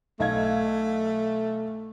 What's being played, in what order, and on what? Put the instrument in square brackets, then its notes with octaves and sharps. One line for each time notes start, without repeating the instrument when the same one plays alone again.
[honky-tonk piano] B1 F5 G#6 [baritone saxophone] A3